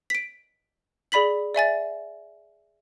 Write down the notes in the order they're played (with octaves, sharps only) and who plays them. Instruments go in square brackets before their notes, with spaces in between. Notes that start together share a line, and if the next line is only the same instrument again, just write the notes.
[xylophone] B6 D7
G#4 D5 B5 B6 F#7
D5 E5 G#5 A6